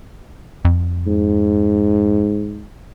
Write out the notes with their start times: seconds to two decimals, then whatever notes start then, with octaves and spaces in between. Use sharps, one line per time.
0.65 F2
1.06 G#2